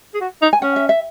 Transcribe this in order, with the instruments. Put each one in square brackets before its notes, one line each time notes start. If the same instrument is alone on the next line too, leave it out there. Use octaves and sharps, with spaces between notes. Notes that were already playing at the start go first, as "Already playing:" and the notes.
[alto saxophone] G#4
F#4
D#4
[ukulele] G#5
[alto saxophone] C#4 [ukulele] F#5
[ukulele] E5
E5